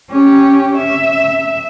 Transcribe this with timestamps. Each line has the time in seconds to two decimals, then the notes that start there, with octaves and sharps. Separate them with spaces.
0.10 C#4 G4
0.77 E5